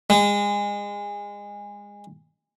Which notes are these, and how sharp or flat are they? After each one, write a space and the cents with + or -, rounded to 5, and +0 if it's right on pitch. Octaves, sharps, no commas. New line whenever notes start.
G#3 -25